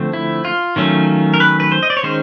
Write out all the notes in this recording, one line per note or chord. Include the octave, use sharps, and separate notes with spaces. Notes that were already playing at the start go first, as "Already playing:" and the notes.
Already playing: D3 F3 A3 C4
E4
F4
D#3 F#3 A3 C#4
A#4
B4
B4
C5
D#5
D5
C#5
D#3 G#3 C#4 C5